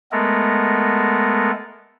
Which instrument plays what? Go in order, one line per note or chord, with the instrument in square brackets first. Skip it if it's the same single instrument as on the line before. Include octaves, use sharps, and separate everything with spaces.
[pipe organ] G#3 A3 B3 A4 A#4